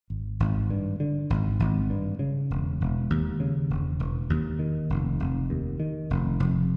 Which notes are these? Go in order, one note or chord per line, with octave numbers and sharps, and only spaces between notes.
G#1
G#1
G2
D3
G#1
G#1
G2
C#3
E1
E1
D#2
C#3
E1
E1
D#2
D#3
F1
F1
D#2
D#3
F1
F1